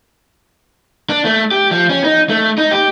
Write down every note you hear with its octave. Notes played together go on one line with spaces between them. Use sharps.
D4
A3
G4
F3
C#4
D#4
A3
D#4
G4